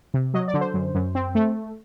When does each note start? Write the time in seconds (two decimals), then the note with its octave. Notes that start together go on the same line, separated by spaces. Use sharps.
0.14 C3
0.34 F#3 D#5
0.48 D5
0.54 D3
0.61 C5
0.74 F#2
0.95 F#2
1.15 C4
1.35 A3